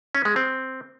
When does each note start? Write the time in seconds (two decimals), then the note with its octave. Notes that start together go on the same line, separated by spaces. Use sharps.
0.15 C#4
0.25 G#3
0.36 C4